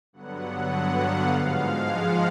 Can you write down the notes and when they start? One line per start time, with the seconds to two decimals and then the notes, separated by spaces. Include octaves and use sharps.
0.13 G2 D3 F#3 B3 F#5
0.71 F#5
0.99 F5
1.28 G#2 F3 G#3
1.85 F#5